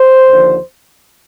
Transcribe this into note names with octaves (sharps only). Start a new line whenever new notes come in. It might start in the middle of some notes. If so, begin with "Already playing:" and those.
Already playing: C5
D#2 D3 F3